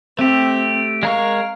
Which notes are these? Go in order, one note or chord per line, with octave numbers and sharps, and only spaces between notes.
A3 C4 G4
G#3 A#4 F5 C#6